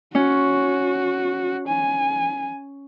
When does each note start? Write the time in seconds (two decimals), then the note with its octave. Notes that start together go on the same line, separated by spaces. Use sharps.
0.15 C#4 F#4
1.68 G#5